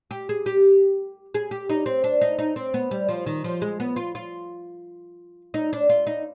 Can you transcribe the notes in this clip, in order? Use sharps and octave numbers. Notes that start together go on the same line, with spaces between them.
G4
G#4
G4
G#4
G4
D#4
C4
D4
D#4
D#4
C4
B3
G3
F3
D#3
F3
G#3
B3
F4
F4
D#4
D4
F4
D#4